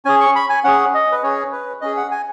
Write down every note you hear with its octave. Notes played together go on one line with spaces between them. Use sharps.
C#4 G#4 G#5
C#6
B5
G#5
C#4 G#4 F#5
D#5
B4
C#4 G#4 C#5
B4
C#4 G#4 D#5
F#5
G#5